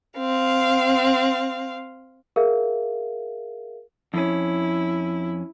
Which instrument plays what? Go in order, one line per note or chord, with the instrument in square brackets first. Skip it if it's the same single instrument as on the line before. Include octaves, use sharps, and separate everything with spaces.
[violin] C4 F5
[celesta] G#4 A#4 E5 F5
[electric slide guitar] F2 C#4 [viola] E4